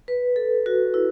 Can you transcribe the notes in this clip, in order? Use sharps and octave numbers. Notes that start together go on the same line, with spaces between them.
B4
A4
F#4
E4